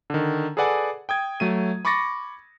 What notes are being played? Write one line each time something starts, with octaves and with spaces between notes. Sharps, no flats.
D3 D#3
G#4 A4 B4 D5 F#5 G#5
G5 D#6 G#6
F#3 A3 D#7
B5 C#6 D6 A6 A#6 C#7